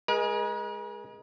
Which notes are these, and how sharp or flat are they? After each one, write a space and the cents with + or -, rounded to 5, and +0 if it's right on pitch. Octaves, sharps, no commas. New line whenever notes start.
G#3 +0 A#4 +45